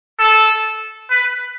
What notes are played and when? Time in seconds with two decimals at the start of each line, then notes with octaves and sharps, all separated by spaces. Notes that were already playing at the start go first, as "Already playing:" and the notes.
0.19 A4
1.10 B4